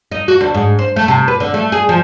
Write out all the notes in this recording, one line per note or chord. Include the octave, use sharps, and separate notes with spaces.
D#4
F#4
D2
G#2
C5
A3
C3
B4
D3
A3
G#4
F3